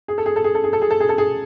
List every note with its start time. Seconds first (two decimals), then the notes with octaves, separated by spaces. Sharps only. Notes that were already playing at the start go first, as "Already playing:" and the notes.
0.08 G#4
0.18 A4
0.26 G#4
0.36 A4
0.44 G#4
0.55 A4
0.64 G#4
0.73 A4
0.82 G#4
0.90 A4
1.00 G#4
1.09 A4
1.18 G#4